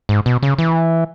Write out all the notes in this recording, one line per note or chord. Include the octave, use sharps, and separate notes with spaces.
G#2
B2
C#3
E3